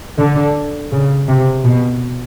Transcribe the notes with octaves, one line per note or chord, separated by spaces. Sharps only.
D3
C#3
C3
B2